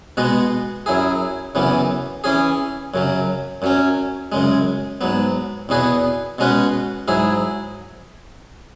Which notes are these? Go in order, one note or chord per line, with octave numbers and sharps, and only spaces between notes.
B2 G#3 B3 F#4
F#2 F#3 E4 G#4
F#2 C#3 E3 B3
E3 C#4 G#4
F#2 C#3 F#3
F#2 F#3 C#4
F#2 C#3 G#3
G#2 F#3 B3
E2 B2 B3 G#4 B4
B2 G#3 C#4 F#4 B4
G#2 F#3 E4 G#4